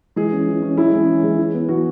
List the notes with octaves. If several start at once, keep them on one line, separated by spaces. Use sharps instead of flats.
E3 G#3 G#4
C#4
E3
C#4
E3 E4
G#3 C#4
E3
G#3 C#4
E3
B3
E3 F#4